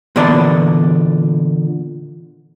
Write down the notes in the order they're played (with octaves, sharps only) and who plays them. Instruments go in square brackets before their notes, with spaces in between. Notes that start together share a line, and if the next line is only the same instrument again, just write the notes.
[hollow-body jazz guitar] A#2 D3 E3 B3 D5 A5